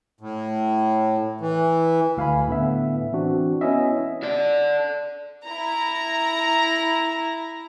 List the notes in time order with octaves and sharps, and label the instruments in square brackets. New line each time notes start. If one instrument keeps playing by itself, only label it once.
[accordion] A2
E3
[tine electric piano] D2 F5 G#5 B5
A2 D3 B3 E5
E3 C4 D4 F#4
B3 C#4 E4 D#5 E5
[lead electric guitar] A4 D5
[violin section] E4 A#5